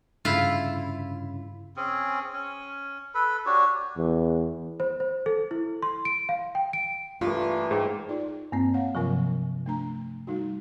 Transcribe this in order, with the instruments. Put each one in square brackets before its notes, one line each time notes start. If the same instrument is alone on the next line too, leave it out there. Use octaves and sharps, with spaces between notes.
[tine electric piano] G2 C#3 C#4 [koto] E4 F4
[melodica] C4 C#4 G#4
C#4
A4 B4 B5
D4 F#4 G4 C#5
[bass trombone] E2
[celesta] C5
C5
A4
E4
C6
D7
F5
G5
D7
[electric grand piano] G2 [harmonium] E3 A3 A#3 [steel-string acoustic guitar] F4
[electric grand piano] G#2 [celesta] G#4 C5 G5
[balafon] D#4 F4 D5
[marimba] G2 A#3 C4
[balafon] C#5 F5 F#5
[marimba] G2 C3 F3 [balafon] F#3 F4 A#4
[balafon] A3 D4 A#5
G3 D#4 F#4